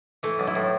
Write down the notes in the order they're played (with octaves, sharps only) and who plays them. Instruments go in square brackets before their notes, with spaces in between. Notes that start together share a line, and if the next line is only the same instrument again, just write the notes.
[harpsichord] E3 [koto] A3
[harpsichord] B1
[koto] E4
[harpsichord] A2